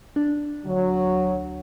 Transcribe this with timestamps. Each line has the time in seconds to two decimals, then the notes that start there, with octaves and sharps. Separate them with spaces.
0.16 D4
0.65 D2 F#3